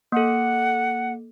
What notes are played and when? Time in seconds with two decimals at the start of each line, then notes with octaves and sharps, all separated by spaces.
0.12 A#3 A4 F#5